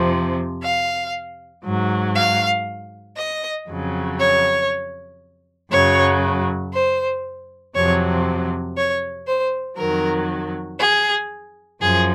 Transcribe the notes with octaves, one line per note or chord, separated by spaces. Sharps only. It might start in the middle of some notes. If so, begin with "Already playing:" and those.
Already playing: F2 C3 F3
F5
G#2 F#3
F5
D#5
F2 C#3 F#3
C#5
F#2 C#3 F#3 C#5
C5
F2 C3 F#3 C#5
C#5
C5
F2 D#3 F#3 A#4
G#4
F#2 F3 G#4